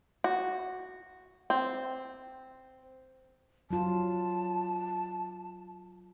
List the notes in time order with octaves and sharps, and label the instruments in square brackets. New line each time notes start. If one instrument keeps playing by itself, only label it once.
[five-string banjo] F#4
C4
[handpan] F#3 F4 [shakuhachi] A5